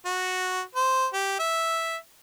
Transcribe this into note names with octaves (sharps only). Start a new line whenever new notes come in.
F#4
C5
G4
E5